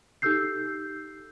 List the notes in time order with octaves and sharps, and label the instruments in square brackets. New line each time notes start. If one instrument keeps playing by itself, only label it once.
[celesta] D#4 G4 A4 E6 G6 C7